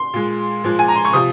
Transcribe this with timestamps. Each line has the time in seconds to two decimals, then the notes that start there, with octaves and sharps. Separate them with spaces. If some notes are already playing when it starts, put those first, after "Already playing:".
Already playing: C6
0.14 A#2 G#3
0.64 A#2 F3 G#3
0.79 G#5
0.88 A#5
0.96 C6
1.05 C#6
1.13 C3 F3 D#6